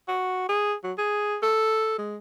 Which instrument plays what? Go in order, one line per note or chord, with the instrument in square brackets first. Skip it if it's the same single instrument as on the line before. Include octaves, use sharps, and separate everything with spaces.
[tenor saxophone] F#4
G#4
F#3
G#4
A4
G#3